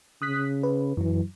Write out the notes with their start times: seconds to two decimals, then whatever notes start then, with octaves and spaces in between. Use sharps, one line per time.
0.22 C#3 D#6 F#6 B6
0.63 B4
0.97 F#2 E3 F#3